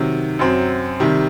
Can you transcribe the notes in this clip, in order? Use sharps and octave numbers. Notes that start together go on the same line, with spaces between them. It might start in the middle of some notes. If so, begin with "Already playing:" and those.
Already playing: C3 D#3 F#3
F#2 F#3 C4
C3 D#3 G3